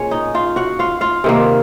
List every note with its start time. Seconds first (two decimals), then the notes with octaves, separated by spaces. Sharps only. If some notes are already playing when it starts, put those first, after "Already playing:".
Already playing: A#2 G#3 C#4 C#5
0.11 D#4 D#5
0.35 F4 F5
0.56 F#4 F#5
0.79 F4 F5
1.01 F4 F5
1.24 C3 D#3 A#3